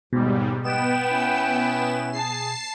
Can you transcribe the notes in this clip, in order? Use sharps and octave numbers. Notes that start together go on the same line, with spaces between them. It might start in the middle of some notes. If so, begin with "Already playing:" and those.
D#2 G#2 B2 G3
B3 B4 D#5 G5 E7
C#4 E4
G#4 A5 C7